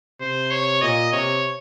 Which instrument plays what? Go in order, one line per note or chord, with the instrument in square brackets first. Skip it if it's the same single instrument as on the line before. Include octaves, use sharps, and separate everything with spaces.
[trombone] C3 [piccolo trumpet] C5
[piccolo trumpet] C#5
[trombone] A#2 [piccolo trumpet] D#5
[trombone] C3 [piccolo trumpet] C#5